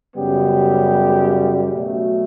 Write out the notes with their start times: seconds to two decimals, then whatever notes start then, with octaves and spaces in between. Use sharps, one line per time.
0.16 F#2 C#3 G3 B3 G4
1.70 B2 F#3 A3